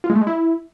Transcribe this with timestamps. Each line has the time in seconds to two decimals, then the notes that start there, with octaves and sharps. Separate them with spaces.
0.04 F4
0.10 G#3
0.15 A3
0.21 G#3
0.27 E4